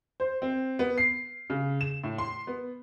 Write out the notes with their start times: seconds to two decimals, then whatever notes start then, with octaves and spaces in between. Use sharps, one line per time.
0.20 C5
0.42 C4
0.79 B3
0.98 C7
1.50 C#3
1.81 E7
2.04 A2
2.18 C6
2.47 B3